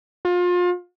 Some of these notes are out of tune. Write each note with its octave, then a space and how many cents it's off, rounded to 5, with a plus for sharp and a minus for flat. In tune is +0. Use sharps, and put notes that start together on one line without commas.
F4 +30